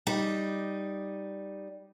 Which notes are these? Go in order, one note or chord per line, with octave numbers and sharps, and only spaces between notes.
G3 D#4